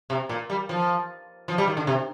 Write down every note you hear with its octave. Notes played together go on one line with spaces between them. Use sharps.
C3
A#2
G3
F3
F3
G3
D#3
D3
C3